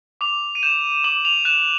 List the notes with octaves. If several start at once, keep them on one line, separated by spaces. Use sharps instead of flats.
D6 F7
D#7
G6 E7
D6 F#7
F7
F#6 E7